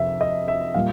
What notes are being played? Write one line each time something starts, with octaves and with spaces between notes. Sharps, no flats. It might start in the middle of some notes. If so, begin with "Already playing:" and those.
Already playing: F2 C3 E5
D#5
E5
A#2 G3 F5